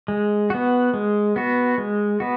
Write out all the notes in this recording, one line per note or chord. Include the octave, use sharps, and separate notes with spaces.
G#3
B3 F#4
G#3
B3 F#4
G#3
B3 F#4